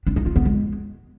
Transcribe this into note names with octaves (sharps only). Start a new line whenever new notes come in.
D4
D#4
F4
B3
G#3